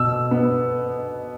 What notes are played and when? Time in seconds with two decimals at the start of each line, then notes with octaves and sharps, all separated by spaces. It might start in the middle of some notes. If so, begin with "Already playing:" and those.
Already playing: B2 E6
0.31 B3